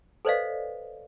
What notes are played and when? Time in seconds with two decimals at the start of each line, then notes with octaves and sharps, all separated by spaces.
0.25 A4 B4 C5 D5 D#5 F5